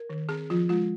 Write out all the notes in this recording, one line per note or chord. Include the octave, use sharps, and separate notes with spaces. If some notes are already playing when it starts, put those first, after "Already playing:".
Already playing: A#4
D#3
C4 G#4
F3 F4
G#3 F4